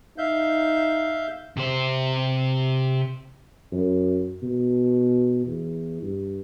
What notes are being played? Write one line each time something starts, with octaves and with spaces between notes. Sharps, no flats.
D#4 E5 F5 G6
C3 C5
F#2
B2
E2
G2